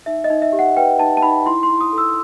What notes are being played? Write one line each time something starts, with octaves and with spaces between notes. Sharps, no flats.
D#4 E5
D#5
D#4
E5
G4
F#5
B4 G5
D#4 A5
A5
D#4 B5
E4 C6
C6
E4
D#6
A4
E6